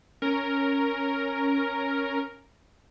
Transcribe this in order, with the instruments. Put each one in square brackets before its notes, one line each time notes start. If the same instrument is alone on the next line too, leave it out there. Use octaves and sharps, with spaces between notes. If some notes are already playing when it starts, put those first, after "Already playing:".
[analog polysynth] C#4 A#4